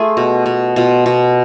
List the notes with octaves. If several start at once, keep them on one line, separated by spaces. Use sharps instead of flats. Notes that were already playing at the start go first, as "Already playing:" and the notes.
Already playing: A3 F4 G#4
B2
B2
B2 F4
B2